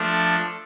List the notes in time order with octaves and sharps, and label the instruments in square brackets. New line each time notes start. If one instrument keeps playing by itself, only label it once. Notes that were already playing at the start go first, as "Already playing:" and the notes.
Already playing: [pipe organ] F3 A3 D4 A4